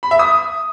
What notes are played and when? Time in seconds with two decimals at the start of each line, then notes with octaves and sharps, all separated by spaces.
0.03 B5
0.11 E5
0.19 D#6